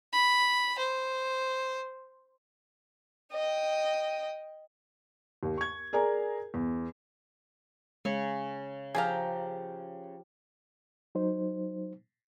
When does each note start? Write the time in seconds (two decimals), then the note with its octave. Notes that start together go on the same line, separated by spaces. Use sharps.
0.13 B5
0.79 C5
3.33 D#5 G5
5.43 D#2
5.58 C#6 G#6
5.93 G#4 A#4 D5 G#5 A#5
6.54 E2
8.05 C#3 G#3 C#5
8.95 F3 G4 G#4 F5 A#5
11.15 F#3 D#4 C5